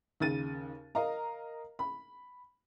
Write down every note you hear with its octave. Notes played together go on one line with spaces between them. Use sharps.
D#2 C#3 A6 D#7
A#4 D#5 F5 A#5
B5